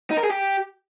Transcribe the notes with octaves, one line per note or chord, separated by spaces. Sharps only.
D#4
A#4
G#4
G4